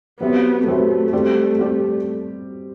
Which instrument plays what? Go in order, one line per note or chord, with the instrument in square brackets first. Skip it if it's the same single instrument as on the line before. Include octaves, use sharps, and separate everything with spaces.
[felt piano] F#3 C4 G4 B4 E5 [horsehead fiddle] B3
[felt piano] F#3 C4 G4 B4 E5 [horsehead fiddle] A3
[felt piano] G3 C4 G4 D5
G3 C4 G4 D5